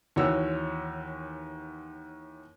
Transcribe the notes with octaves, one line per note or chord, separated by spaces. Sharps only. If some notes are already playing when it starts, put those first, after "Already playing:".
D#2 E3 F#4 C#5 E6